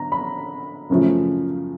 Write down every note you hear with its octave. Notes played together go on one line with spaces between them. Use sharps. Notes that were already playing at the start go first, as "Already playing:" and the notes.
Already playing: D3 A#5
B5
F#2 C#3 F3 A3